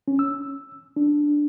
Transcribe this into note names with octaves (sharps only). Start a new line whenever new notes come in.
C#4
E6
D4